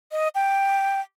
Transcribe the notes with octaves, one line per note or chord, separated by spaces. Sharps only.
D#5
G5